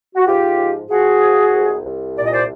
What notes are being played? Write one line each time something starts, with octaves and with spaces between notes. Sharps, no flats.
F#4
G#2 F4 G4
F3
F3 F#4 G#4
G#2
C2
C2
A#2 D5
D#5
C5 D5